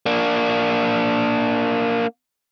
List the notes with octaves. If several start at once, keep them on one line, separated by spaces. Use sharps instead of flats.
A#3 D4